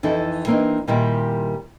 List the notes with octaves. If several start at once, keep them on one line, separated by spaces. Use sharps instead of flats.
F2 E3 D#4 E4 A4
E3 A#3 C4 D4 D#4
A#2 D#3 G3 C4 E4 G4